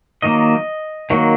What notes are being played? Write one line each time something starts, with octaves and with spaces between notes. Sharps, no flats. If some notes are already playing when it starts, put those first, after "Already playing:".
D#3 F#3 A#3 D#5
D#3 F#3 A#3